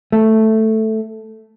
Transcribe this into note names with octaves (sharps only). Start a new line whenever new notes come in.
A3